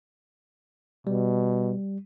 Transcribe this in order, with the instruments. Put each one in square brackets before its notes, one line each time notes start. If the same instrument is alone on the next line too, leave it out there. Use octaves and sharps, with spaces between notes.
[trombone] B2 [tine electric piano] G3